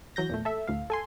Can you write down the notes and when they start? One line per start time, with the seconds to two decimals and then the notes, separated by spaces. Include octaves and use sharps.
0.16 E3 F#3 G6 A#6
0.30 E2 A#2 A3
0.45 A4 E5
0.67 D2 A2 F5
0.90 A4 G#5 C6